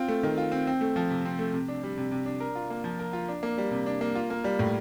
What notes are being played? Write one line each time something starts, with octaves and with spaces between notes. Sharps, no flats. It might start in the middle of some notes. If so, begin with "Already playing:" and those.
Already playing: C4 F4
A3
D#3
F4
C4
C4
A3
F3
C3
C4
A3
C3
D4
G3
C3
C3
D4
A#4
F4
A#3
F3
A#4
F4
D4
A#3
G3
C3
D4
A#3
F4
A#3
G3
A2